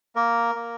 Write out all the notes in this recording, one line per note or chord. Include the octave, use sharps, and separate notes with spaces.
A#3 A#4
A#3